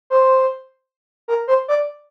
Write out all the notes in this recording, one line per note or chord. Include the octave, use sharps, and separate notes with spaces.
C5
A#4
C5
D5